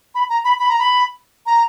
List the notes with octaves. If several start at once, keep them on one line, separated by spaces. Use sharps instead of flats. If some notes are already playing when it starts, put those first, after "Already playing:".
B5
A#5
B5
B5
A#5
B5
A#5